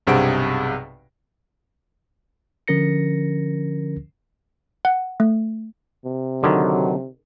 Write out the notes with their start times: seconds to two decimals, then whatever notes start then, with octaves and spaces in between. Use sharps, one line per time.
0.07 B1 G2 C3 G#4 F#5 D7
2.68 D3 F3 C#4 A#4 A#6 C#7
4.85 F#5
5.20 A3
6.05 C3
6.43 D3 D#3 F#3